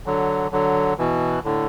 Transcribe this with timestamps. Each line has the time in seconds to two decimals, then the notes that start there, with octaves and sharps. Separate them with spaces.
0.06 D3 F#3
0.52 D3 F#3
0.98 B2 E3
1.44 A2 D3